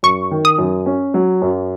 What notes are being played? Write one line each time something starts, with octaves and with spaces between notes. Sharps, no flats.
F#2 C#6
D#3
D#6
F#2
C#4
F#3
F#2